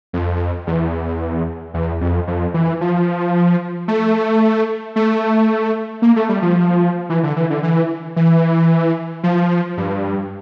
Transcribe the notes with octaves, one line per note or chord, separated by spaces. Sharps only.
F2
E2
E2
F2
F2
E3
F3
A3
A3
A#3
A3
G3
F3
E3
D3
E3
D3
E3
E3
F3
G2